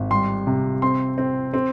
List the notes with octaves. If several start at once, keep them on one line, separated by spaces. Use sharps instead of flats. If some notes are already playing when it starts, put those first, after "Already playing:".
Already playing: G#1
G3 C6
C3
C4 C6
C4
C4